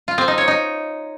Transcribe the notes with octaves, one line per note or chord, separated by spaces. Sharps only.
F4
C4
D#4
C#5
D#4